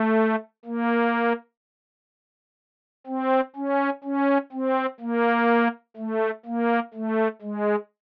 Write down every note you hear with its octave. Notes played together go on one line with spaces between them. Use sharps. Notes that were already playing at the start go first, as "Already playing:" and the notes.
Already playing: A3
A#3
C4
C#4
C#4
C4
A#3
A3
A#3
A3
G#3